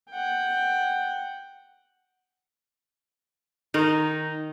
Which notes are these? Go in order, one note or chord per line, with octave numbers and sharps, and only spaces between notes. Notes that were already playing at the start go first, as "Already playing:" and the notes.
F#5 G5
D#3 D#4